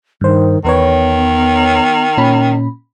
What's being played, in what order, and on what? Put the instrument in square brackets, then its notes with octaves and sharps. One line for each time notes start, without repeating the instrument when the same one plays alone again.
[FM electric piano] G2 C5 [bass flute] D#3
[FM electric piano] E2 B4 C#5 [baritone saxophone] D#3 [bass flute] B3
[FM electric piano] A#2 C#4 B5